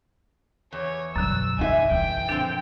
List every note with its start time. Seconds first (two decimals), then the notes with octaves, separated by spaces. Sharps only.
0.72 E2 C#5
1.16 F#2 B2 D3 F#3 E6
1.59 E2 D#4 F4 D#5 E5 G#5
1.91 E3 G5
2.28 A#2 D3 F3 C4 D4 A6